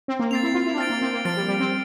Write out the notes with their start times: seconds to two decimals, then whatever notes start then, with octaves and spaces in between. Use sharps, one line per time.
0.08 C4
0.19 A#3
0.31 C4 A6 C7 F7
0.43 E4
0.54 F4
0.66 E4
0.74 D4
0.78 C4 F6 A6 D7
0.90 A#3
1.02 C4
1.13 A#3
1.25 F3 F6 A6 D7
1.37 G3
1.48 G3
1.60 C4